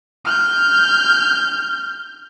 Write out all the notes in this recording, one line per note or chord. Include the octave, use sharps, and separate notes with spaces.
F6 G6